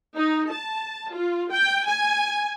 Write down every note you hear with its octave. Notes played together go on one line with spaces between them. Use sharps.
D#4
A5
F4
G5
G#5